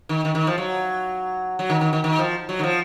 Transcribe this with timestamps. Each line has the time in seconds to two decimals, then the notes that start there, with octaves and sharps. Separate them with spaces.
0.09 D#3
0.25 D#3
0.35 D#3
0.47 F3
0.58 F#3
1.59 F#3
1.70 D#3
1.81 D#3
1.93 D#3
2.04 D#3
2.18 F3
2.49 F#3
2.59 D#3
2.63 F3